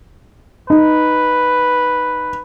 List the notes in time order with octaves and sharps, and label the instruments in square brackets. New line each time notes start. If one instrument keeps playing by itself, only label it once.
[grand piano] D#4 [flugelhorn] B4